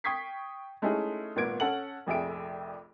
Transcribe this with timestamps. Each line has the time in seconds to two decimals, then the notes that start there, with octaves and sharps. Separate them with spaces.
0.04 G5 C#6 D#6 G#6 B6 C7
0.82 G#3 A3 C#4 D#4 E4 G#4
1.36 G#1 A#2 B3 A#4 G#6 D7
1.60 C#4 A4 F#5 F#7
2.06 F1 A#1 F2 G#4 E5 D7